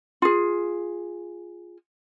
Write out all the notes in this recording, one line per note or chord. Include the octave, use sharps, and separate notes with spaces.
F4 G#4